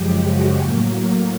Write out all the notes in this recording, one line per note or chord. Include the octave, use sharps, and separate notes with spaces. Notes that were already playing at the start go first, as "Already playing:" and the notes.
Already playing: F#2 C#3 F3 G#3 G4
F#4
A2 F#3 A#3